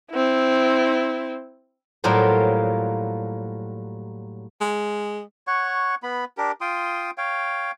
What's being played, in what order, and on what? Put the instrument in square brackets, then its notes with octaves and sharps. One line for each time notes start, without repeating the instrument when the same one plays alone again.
[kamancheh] C4 E4
[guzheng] A2 F#3 G3 A#3 F4 C5
[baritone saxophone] G#3
[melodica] C#5 F#5 C#6
B3 B5
D4 G4 A#4
F4 G5 C6 D#6
C#5 F5 G5